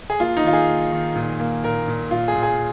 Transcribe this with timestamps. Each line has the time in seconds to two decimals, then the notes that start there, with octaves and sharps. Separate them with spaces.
0.10 G#4
0.20 A#3 F4
0.37 D#4
0.44 D#3 F4
0.53 G#4
0.69 A#3
0.92 D#3
1.16 A#2
1.40 A#3
1.64 A#2 A#4
1.88 A#2
2.11 A#2 F4
2.28 G#4
2.35 A#2
2.43 G#4